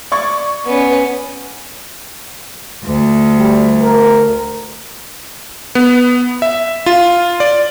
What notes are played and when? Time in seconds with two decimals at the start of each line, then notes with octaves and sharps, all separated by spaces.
0.12 D5 C#6 G#6
0.65 B3 C#4
2.85 D2
3.37 G3
3.81 A#4
5.75 B3
6.42 E5
6.86 F4
7.40 D5